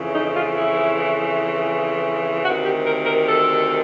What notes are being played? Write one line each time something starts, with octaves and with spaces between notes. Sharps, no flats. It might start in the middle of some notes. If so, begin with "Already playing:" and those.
Already playing: F2 C#3 E3
D#4
F4
E4
D2 C3 D#3 F#4
G4
A#4
A#4
A4